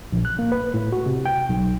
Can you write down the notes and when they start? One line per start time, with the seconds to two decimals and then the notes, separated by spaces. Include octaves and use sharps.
0.12 A#1
0.25 F#6
0.39 A#3
0.52 B4
0.74 A2
0.92 F#4
1.06 C3
1.25 G5
1.49 B1